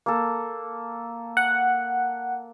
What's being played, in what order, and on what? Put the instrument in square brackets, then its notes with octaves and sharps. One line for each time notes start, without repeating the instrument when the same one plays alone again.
[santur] A#3 A4
[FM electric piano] F#5